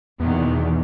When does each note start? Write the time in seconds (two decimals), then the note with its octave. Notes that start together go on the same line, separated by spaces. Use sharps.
0.20 E2 B2 D#3 B3